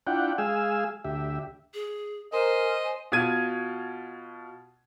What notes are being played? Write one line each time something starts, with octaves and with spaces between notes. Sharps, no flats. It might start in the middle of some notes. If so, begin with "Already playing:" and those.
D4 E4 F4 F#5 G5
G#3 G#4 F5 G#5 E6
D2 G4 E5
G#4
A#4 C5 D#5 G#5
B2 F4 G#6 D#7